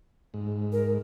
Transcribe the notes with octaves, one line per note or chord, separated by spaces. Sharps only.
G#2
A#4